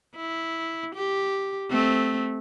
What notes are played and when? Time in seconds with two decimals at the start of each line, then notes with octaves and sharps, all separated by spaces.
0.16 E4
0.95 G4
1.70 A3 C4